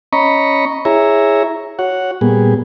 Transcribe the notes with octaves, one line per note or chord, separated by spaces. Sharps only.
C#4 D#5 A#5 B5 C#6
E4 G#4 C#5 E5 A#5
F#4 C#5 F#5
A#2 G3 B3 G#4